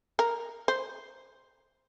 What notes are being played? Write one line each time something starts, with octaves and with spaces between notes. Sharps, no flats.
A#4
C5